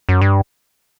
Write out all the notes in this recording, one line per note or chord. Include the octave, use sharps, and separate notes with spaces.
F#2
G2